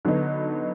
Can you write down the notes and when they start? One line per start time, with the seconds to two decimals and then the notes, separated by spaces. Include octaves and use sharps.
0.05 D3 F#3 B3 D#4